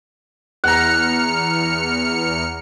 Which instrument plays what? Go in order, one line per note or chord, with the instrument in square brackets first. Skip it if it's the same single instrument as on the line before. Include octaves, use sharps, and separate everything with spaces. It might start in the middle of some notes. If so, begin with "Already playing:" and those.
[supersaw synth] E2 F6 C#7 [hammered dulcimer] F#5 A#5